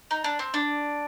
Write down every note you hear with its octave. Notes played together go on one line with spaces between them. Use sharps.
D#4
D4
C4
D4